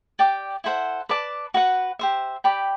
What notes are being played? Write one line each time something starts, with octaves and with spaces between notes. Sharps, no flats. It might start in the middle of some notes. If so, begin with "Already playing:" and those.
G4 D5 G5 D6
E4 A4 C5 F#5
B4 D5 A5 D6
F#4 B4 F#5
G4 C5 E5
G4 D5 G5 B5